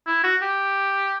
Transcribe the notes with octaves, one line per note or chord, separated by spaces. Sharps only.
E4
F#4
G4